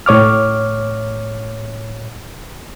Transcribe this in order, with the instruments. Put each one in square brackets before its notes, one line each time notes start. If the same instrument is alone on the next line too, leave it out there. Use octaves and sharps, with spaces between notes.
[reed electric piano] A2 C#5 D6 F6